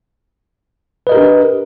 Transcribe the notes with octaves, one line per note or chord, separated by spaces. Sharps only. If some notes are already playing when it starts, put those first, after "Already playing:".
D4 G4 A#4 B4 D#5